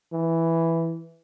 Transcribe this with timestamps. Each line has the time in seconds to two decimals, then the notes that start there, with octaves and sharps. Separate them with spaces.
0.12 E3